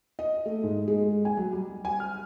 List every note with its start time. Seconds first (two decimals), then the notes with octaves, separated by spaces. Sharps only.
0.19 D#5
0.46 A3
0.63 G#2
0.88 G#3
1.25 G#5
1.37 F#3
1.52 G3
1.85 G#5
2.00 F6